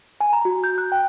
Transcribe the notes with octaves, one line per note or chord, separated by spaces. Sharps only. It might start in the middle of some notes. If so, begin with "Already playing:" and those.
G#5
A#5
F#4
G6
F#6
G5